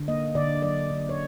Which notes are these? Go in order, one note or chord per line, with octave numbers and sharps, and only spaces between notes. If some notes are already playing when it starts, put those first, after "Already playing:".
Already playing: D3
A#3 D#5
D3 D5
F#3 D5
D3
C#5